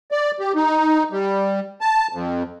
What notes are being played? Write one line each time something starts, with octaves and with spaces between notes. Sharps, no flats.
D5
G4
D#4
G3
A5
F2